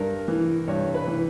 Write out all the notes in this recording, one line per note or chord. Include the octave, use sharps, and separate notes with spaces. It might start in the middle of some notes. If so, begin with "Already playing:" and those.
Already playing: G2 A#4
E3
G2 C#5
B4
E3